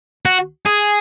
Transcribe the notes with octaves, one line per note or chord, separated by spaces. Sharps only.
F#4
G#4